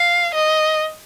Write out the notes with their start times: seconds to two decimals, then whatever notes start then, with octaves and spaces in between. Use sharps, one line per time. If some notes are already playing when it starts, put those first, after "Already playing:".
Already playing: F5
0.34 D#5